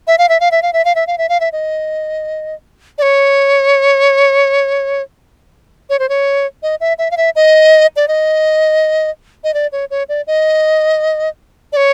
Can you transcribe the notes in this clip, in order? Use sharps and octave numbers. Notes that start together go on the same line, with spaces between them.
E5
F5
E5
F5
E5
F5
E5
F5
E5
F5
E5
F5
E5
D#5
D5
C#5
C#5
C5
C#5
D#5
E5
E5
F5
E5
D#5
D5
D#5
D#5
D5
C#5
C#5
D5
D#5
D5
C#5